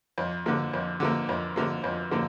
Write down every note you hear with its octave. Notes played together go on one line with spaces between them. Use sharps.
F2
D3 F3 A#3
F2
D3 F3 A#3
F2
D3 F3 A#3
F2
D3 F3 A#3